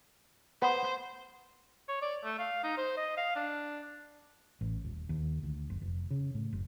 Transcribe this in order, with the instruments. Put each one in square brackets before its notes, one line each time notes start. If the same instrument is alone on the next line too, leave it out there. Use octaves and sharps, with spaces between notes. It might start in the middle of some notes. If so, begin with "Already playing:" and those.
[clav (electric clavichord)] B3 [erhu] C5
[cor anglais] C#5
D5
A3
F5
D#4
C5
D#5
F5
D4
[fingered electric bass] A1
D#1
D#2
D2
F#1
F1
C#3
A2
F#1